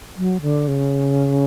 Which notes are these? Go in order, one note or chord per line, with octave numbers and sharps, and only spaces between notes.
F#3
D3
C#3